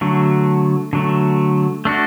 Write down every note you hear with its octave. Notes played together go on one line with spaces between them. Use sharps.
D3 F#3 A3
D3 F#3 A3
A3 D4 F#4